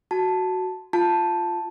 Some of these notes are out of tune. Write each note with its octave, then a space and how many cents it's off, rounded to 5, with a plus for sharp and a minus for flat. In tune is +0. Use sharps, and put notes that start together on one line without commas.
F#4 +0 A5 +0
F4 -5 A5 +0